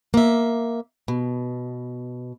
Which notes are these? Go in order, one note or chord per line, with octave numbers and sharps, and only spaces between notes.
A#3 E5
B2